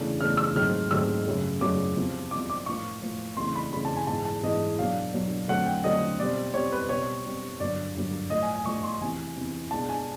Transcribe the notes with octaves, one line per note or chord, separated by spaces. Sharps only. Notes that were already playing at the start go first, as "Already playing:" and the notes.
Already playing: E2 C#3 E3 A3 D4
E2 C#3 E3 A3 D4 F6
E6
G#2 D#3 F#3 A3 C4 F6
G#2 D#3 F#3 A3 C4 E6
F#2 C#3 F#3 A3
F#2 C#3 F#3 A3 D6
E2 C3 F3
E2 C3 F3 D6
D6
A2 F3 A#3 C#6
A2 F3 A#3
F2 C#3 E3 A3 C6
B5
F2 C#3 E3 A3 B5
A5
G#5
G#2 E3 G#3 B3 A5
A5
G#2 E3 G#3 B3 D#5
B2 F#3 A#3 D4 F5
B2 F#3 A#3 D4
D3 F#3 A3 C4 F#5
G5
D3 F#3 A3 C4 D#5
B2 G3 C4 D5
B2 G3 C4 C#5
B4
B2 G3 C4 C#5
B2 G3 C4
G2 D3 F#3 A#3 D5
G2 D3 F#3 A#3
A2 F3 A3 D#5
G#5
G#5
A2 F3 A3 C#6
C6
E2 C3 E3 G#5
E2 C3 E3
E2 B2 G#3 B3 D4 A5
G#5